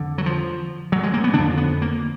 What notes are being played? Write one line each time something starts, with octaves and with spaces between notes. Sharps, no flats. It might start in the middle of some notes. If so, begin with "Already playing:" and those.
Already playing: F2 D3
F#3
F3
F#3
G#3
A#3
B3
D3 D4
F2
B3
A#3